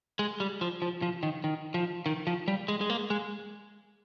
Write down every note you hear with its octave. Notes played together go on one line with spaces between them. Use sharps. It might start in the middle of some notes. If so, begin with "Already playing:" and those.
G#3
G3
F3
F3
F3
D#3
D#3
F3
D#3
F3
G3
G#3
G#3
A#3
G#3